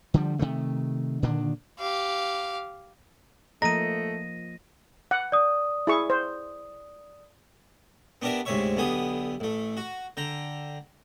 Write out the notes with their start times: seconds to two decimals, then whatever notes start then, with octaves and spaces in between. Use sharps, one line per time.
0.14 D3 F3 G3
0.39 C3 D#3 A3
1.23 A#2 D3 D#3 D4
1.79 G4 F5
3.62 F3 A3 A#3 D#5 A#5 A#6 D#7
5.11 F#5
5.32 D5 D#6
5.87 E4 G#4 C#6
6.10 C5
8.22 B3 D4 G4 A#4 D5 E5
8.45 D2 G#2 C3 C#5 E5 C#6
8.77 B1 D3 B3 G4 G#5 D#6
9.40 A1 A3
9.77 F#4
10.17 D3 G5 A#5